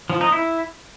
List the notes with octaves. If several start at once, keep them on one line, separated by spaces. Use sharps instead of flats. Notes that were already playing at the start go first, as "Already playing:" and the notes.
F3
D#4
E4